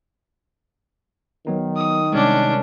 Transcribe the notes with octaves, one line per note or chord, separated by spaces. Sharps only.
D#3 F#3 B3 D#4
D#6
C3 G3 G#3 C#4 D4